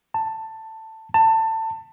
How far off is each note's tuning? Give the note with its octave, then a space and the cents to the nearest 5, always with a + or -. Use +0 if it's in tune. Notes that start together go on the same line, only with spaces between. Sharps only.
A5 +15
A5 +25